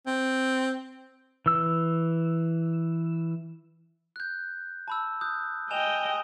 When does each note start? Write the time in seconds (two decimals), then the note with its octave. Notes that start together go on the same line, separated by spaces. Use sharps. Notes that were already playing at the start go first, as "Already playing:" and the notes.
0.07 C4
1.46 E3 E6
4.16 F#6 G6
4.88 A5 B5 E6
5.21 D#6 F#6 G6
5.71 D#5 G5 G#5 E7 F7